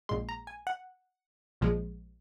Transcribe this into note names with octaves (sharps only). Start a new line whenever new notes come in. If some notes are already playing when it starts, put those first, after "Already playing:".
A#1 A#2 G#3 C6
A#5
G#5
F#5
A#1 A#2 F3 G#3